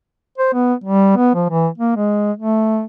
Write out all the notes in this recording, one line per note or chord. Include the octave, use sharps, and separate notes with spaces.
C5
B3
G3
B3
F3
E3
A#3
G#3
A3